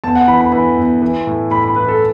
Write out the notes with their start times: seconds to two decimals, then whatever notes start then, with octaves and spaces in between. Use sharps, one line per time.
0.04 E2 A5
0.15 F#5
0.28 E3 B5
0.41 B5
0.52 E3 B5
0.77 E2
1.02 E3
1.27 A2
1.51 A2 B5
1.64 B5
1.76 E3 B4
1.88 A4